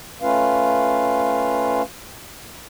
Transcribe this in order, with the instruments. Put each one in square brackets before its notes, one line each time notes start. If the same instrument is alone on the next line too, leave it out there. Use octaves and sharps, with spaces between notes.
[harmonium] A3 C#4 F4 B4 F5